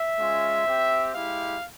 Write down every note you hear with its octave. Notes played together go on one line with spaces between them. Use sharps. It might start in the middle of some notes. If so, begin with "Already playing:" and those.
Already playing: E5
G#3 C#4 F4
C4 G4
G#3 E4 G4 F5